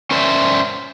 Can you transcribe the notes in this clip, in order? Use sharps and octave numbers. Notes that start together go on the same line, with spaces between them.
C#4 A#4 C5 D5 E5